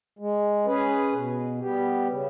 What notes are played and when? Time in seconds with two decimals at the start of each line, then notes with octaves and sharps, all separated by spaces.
0.19 G#3
0.66 C#4 G#4 B4
1.13 B2
1.61 G3 B3 G4
2.07 C#3